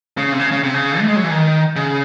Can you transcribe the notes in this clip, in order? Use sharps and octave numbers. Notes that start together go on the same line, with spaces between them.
C#3
C3
C#3
C#3
C3
C#3
A3
G#3
F#3
E3
D#3
C#3